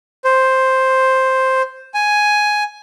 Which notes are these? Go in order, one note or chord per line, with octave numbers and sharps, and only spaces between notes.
C5
G#5